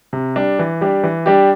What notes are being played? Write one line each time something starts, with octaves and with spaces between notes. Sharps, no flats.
C3
G3 D4
E3
G3 D4 G4
E3
G3 D4 G4